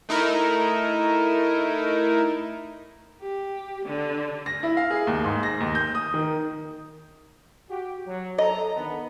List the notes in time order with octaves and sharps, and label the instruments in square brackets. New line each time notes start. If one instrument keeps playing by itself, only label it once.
[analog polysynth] A3 D#4 E4 A#4
[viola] G4
D3
[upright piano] A#6
E4
F5
G#4
D#2
G#2
A#6
D#2
G6
D#6
D#3
[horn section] F#4 G4
F#3
[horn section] A4 A#5 [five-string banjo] D#5
[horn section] D3 D#3 B3